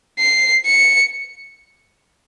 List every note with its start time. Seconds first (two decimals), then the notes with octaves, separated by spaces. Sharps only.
0.19 C7
0.67 C#7